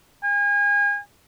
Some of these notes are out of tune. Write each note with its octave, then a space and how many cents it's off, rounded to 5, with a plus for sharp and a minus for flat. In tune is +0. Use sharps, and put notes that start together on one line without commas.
G#5 -35